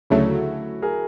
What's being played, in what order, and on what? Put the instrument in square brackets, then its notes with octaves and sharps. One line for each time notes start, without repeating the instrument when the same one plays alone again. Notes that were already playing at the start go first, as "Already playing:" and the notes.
[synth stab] D2 C#3 F#3 A3 [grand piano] E4 F#4
[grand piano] G#4 A#4